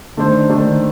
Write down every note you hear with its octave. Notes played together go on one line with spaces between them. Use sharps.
D#3 A3 D4 A4 C5
D#3 A3 D4 A4 C5